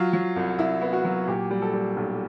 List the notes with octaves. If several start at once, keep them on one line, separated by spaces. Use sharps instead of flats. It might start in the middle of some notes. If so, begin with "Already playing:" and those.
Already playing: F#3 F4
F#3
C2
C2 E4
B3
F#4
F#3
A#2 G4
G3
A4
G3
B1